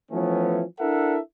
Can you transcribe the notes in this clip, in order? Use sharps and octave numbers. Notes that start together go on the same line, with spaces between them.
E3 F3 A3 B3 C#4
D4 E4 A4 A#4 E5 F#5